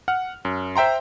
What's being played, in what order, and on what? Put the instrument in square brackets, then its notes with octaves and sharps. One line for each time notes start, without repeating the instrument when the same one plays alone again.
[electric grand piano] F#5 F6
F#2
C5 E5 G5 A#5 C6